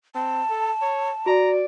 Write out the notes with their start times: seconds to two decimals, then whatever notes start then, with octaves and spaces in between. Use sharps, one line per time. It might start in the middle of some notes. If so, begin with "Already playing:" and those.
0.15 C4 A5
0.50 A4
0.82 C#5
1.26 F#4 D5 A#5